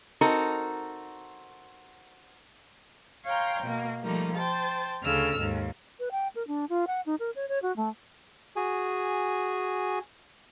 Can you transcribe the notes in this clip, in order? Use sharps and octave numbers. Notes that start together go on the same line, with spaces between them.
C4 D#4 F#4 A4 A#4
C#5 F5 G5 A#5 C6
B2 A#3
F3 G3 A3 A#3 D#4
C5 G5 A5 A6
D2 C#3 A4 E6 F6
D#2 G#2
B4
G5
A#4
D4
F4
F#5
D#4
A#4
C#5
C#5
F#4
A3
F#4 G#4 G#5